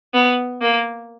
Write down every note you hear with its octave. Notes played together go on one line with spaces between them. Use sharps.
B3
A#3